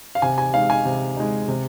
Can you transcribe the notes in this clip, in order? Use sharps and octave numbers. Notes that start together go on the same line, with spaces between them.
F5
C3 G#5
G#5
G#3 D#4 F5
G#5
C3
G#3 D#4
C3